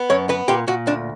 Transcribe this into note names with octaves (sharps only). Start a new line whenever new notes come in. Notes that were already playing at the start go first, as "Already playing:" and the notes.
Already playing: B3
F#2 C#5
B3 B4
A#2 G4
A#2 F#4
D2 D4